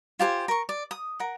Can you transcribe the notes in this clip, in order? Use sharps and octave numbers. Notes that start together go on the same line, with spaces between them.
F4 G4 C5 G#5
A#4 C#6
D5
D#6
A#4 F#5